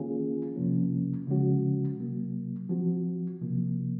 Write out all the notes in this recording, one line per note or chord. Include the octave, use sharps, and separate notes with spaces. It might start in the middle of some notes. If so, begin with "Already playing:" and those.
Already playing: D#3 A#3 C#4 F4 G#4
F2 C3 F3 A#3 C#4
C#3 F3 G#3 C#4 F#4
C3 F#3 A#3
F3 C4 F#4
C3 F3 A#3